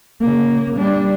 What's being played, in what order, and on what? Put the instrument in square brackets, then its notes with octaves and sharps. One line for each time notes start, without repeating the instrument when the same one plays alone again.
[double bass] C#3 A#3
G3 D4